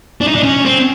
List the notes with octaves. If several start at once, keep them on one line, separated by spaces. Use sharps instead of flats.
D4
D#4
D4
C#4
C4